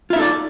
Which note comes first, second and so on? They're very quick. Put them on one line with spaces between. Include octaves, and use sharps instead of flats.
F4 E5 D#4 A4 D5